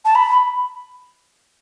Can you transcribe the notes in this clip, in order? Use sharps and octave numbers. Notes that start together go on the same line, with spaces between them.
A5
B5